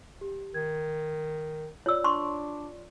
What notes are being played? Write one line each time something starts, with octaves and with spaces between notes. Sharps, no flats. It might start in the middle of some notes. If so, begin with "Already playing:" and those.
G4
D#3 G#6
F4 C#5 D5 E6
D4 C6 C#6